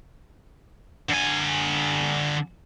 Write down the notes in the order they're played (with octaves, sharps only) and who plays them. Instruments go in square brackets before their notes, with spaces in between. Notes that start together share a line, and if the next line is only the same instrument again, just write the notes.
[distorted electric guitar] D3 G#5